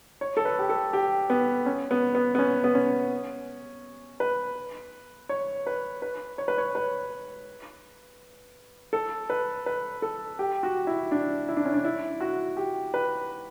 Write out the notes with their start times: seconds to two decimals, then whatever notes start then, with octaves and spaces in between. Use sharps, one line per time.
0.21 C#5
0.37 A4
0.45 B4
0.59 G4
0.69 A4
0.93 G4
1.30 B3
1.66 C#4
1.91 B3
2.15 B3
2.35 B3
2.39 C#4
2.64 B3
2.75 C#4
4.20 B4
5.29 C#5
5.67 B4
6.02 B4
6.38 C#5
6.48 B4
6.58 C#5
6.75 B4
8.93 A4
9.30 B4
9.66 B4
10.02 A4
10.39 G4
10.63 F#4
10.87 E4
11.11 D4
11.48 E4
11.57 D4
11.65 C#4
11.74 D4
11.84 E4
12.21 F#4
12.57 G4
12.94 B4